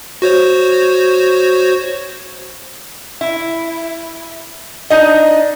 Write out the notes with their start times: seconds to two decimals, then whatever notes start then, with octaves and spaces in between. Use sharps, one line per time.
0.22 F#4 C5 C#5
3.21 E4
4.90 D4 D#4 D#5